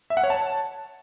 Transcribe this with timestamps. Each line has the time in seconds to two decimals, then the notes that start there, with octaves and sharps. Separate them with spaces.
0.10 E5
0.17 F#5
0.24 C#5
0.30 A5